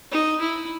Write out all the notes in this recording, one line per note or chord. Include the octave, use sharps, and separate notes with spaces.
D#4
E4